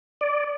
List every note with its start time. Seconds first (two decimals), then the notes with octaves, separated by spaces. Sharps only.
0.21 D5